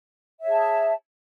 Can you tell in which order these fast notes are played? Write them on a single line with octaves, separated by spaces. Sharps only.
E5 C#5 G#4 A5